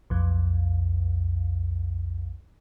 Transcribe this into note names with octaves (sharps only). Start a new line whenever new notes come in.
B1 F2